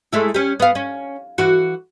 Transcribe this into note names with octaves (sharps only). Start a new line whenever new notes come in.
G#3 A3 E4
C#4 G4
B3 F5
C#4
E3 F#4